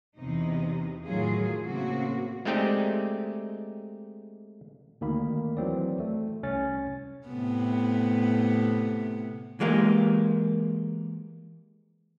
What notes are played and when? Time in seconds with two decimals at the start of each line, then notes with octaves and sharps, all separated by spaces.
0.18 E2 C3 D#4
1.05 A2 D#3 F#3 F4 G#4
1.64 A2 C#3 A#3 C4 F#4
2.45 G#3 A3 C4 D#4 G4 D5
5.01 D2 D#3 A#3 B5
5.57 E3 F#3 C4 D5
6.00 A3
6.43 C2 C#4 A6
7.28 A2 C3 B3
9.60 E3 G#3 A#3 G4